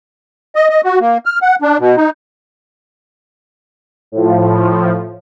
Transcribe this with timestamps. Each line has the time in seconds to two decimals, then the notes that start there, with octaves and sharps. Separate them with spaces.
0.56 D#5
0.70 D#5
0.84 F#4
1.00 A#3
1.25 F6
1.42 F#5
1.62 D4
1.80 B2
1.97 D#4
4.12 A2 F3